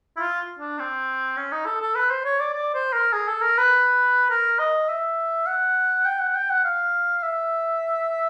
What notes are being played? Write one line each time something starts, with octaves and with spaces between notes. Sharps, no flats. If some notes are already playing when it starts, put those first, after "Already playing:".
E4
F4
D4
C4
C#4
D#4
A4
A4
B4
C5
C#5
D5
D5
C5
A#4
G#4
A4
A#4
B4
A#4
D#5
E5
F#5
G5
F#5
G5
F#5
F5
E5